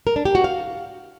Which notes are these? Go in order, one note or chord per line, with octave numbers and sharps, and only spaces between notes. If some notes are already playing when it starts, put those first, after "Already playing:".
A#4
D4
G4
F#4
F5